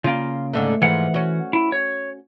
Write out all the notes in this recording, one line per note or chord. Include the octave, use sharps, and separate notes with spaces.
C#3 A#3 F4
G#2 D3 A3
G#2 E3 F3 F#5
C#4 F#4
E4
C#5